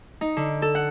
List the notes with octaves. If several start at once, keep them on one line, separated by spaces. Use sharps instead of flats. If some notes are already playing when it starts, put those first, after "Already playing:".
D#4
D3
A4
F#5